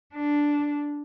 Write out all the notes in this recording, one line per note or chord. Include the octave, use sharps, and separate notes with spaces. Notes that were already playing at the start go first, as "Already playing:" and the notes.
D4